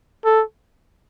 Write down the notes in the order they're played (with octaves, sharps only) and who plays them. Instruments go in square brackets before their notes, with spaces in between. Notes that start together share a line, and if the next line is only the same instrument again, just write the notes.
[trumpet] A4